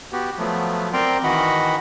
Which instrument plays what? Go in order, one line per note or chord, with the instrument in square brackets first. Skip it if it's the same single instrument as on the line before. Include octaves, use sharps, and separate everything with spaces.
[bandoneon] B3 F#4 G4
F3 F#3 A3 B3
C4 A#4 D5 G5 A#5 C6
D#3 E3 F#4 D#5 F#5 B5